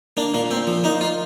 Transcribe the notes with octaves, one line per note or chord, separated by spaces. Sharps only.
A#3 D4
A#2 A#3
A#2 C4
F3
A#3 D#4
F4